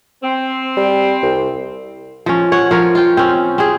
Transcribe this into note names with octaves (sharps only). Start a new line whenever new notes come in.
C4
G3
C2
F3 C#4
C#5 F#5
F3 A#4 C#5
F4 G5
C4 C#4
C4 G#4